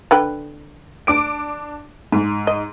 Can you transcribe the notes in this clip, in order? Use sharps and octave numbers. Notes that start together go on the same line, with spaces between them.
D3 B4 G5
D4 D6 D7
G#2
D#5